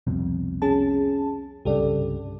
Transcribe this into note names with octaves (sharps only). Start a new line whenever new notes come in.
C2 F2 B2
C#4 G#4 A5
C2 G2 C#3 G4 A4 D5